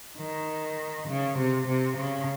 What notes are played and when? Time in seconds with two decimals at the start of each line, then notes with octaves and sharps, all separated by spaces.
0.18 D#3
1.08 C#3
1.38 C3
1.67 C3
1.97 C#3